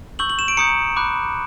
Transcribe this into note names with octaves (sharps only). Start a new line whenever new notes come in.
C#6 E6 G6 F#7
F#7
E7
D7
A#5 D#6 G6 C#7
B5 D6 F#6